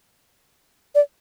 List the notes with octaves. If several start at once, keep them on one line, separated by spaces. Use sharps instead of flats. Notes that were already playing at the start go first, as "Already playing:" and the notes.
D5